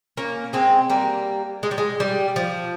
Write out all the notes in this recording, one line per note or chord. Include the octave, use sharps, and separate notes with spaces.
A#3 C#4
G#3 C4
G3 A#3
G#3
G3
G#3
G3
F3